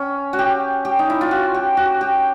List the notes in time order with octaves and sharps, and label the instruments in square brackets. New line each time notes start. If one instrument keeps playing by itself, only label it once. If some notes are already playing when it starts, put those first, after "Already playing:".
Already playing: [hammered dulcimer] C#4
F#4
G4
G4
D#4
E4
F4
F#4
G4
F#4
G4